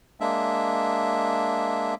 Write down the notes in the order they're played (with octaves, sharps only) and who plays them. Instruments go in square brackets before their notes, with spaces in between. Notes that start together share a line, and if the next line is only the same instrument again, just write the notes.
[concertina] G#3 A#3 D4 E5